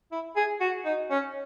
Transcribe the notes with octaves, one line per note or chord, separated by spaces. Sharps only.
E4
G#4
F#4
D#4
C#4